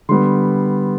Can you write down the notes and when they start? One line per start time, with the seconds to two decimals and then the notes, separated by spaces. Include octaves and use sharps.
0.09 D3 G3 B3 C6